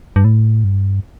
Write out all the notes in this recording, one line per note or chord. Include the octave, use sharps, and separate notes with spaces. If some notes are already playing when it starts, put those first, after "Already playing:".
G2
A2
G2